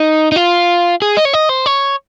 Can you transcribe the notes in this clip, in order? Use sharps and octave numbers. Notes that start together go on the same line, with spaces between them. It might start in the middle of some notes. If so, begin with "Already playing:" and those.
Already playing: D#4
D#4
F4
G#4
D#5
C#5
D#5
C5
C#5